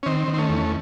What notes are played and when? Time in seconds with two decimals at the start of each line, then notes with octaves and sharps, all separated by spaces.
0.03 C#4
0.06 D#3 C4
0.28 D#3
0.34 C4
0.38 A3 C#4
0.49 E2